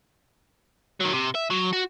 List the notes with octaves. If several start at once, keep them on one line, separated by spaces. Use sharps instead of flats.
D#3 F#3
C3
E5
F#3
F#4